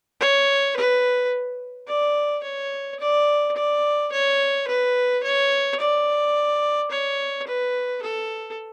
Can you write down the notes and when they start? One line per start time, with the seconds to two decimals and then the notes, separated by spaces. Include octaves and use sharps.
0.21 C#5
0.77 B4
1.88 D5
2.43 C#5
3.00 D5
3.56 D5
4.12 C#5
4.68 B4
5.23 C#5
5.80 D5
6.91 C#5
7.47 B4
8.02 A4